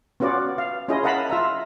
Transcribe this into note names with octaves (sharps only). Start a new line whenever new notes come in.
B3 C#4 F4 F#4 D5
F5
C#4 E4 F4 G#4 D#5
A#4 D#5 F5 F#5 A5 B5
F4 E5 A#5